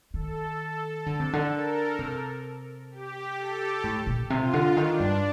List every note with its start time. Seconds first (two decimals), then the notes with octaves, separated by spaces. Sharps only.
0.13 D#3 A4
1.06 D3
1.20 C3
1.33 D3
1.52 A#4
1.99 C3
2.91 G4
3.37 A4
3.84 A2
4.07 A#2
4.30 C3 F4
4.53 D3
4.76 D#3 D4
5.00 G2